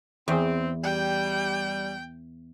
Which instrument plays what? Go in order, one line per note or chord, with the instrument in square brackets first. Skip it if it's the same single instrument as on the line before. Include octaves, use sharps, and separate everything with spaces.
[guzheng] E2 [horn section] C4
[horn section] G3 [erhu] G5